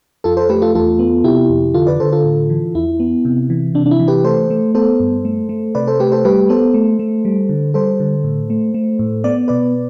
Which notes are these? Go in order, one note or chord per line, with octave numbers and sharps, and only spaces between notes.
F2 F4 A4
A4 C5
A3 G4 B4
F4 A4
E2 F4 A4
B3
C3 E4 G4
F2
D3 F4 A4
B4 D5
D3 A4 C5
F4 A4
A2
E3
E2 E4
B3
C3
E3
C3 D4
D4
E4
E3
G4 B4
A3 A4 C5
A3
B3 A4 C5
G2
A3
A3
C3 B4 D5
A4 C5
A3 G4 B4
A4 C5
G3 G4 B4
B3 A4 C5
A3
A3
G3
D3
G3 A4 C5
D3
A2
A3
A3
A2
B3 D5
B2 B4 D5